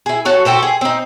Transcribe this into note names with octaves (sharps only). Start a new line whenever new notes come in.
E4 G#4
F#4 A4 C#5
F#4 G4 A4 C5
G#4
C4 D#4